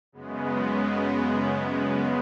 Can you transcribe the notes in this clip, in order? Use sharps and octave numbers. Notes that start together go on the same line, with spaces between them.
F#2 C#3 G#3 B3